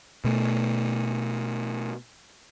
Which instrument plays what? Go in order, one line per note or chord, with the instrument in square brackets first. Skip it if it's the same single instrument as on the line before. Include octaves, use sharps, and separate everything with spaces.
[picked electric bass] B2 A3